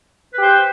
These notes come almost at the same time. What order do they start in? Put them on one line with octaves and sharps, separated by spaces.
B4 G4 C5 G5